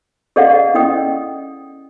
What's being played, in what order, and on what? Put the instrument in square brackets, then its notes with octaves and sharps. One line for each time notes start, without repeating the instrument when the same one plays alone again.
[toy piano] G#4 A4 D5 D#5 F5 F#5
C#4 E4 D#5 G5 D#6